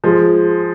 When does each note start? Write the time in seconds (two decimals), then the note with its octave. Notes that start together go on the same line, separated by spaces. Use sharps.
0.04 F3 G#3